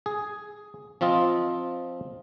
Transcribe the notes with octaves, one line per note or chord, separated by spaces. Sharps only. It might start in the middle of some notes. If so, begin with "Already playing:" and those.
G#4
F3 C4 F4 D#5